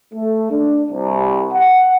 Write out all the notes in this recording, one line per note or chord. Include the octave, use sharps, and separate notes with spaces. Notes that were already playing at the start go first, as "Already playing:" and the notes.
A3
D4
C2
F#5